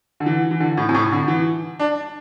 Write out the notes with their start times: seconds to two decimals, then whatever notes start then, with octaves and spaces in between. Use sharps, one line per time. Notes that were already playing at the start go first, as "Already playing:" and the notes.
0.20 D3
0.26 E3
0.51 E3
0.60 D3
0.78 A2
0.89 C3
0.95 A2
1.12 D3
1.28 E3
1.79 D4